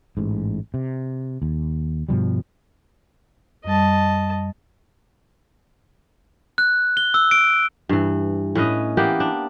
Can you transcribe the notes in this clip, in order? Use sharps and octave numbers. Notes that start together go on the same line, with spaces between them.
A1 G#2
C3
D#2
G2 B2 F3 G3
F#2 G3 D#5 A5
F#6
G7
E6
D7
G2 E3
A2 C#4 B4 D#5
E3 A#3 B3 G4
D4